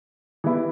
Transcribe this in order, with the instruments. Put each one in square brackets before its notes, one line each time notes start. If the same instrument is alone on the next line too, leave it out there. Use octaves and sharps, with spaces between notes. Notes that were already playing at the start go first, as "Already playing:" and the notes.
[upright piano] E3 G3 B3 E4